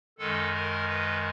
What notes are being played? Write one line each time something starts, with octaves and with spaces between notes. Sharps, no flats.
F#2 D#3 G#3 A4
A#4
B4